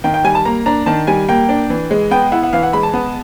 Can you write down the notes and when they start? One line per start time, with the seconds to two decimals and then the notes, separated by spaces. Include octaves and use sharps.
0.04 D#3 G5
0.14 G5
0.24 G3 G#5
0.35 A5
0.45 A#3 A#5
0.66 D4 A#5
0.86 D#3 A5
1.07 G3 G#5
1.29 A#3 G5
1.49 D4
1.70 E3
1.91 G#3
2.11 B3 G5
2.32 E4 F#5
2.43 F#5
2.53 E3 F5
2.63 F#5
2.73 G#3 B5
2.83 A5
2.93 B3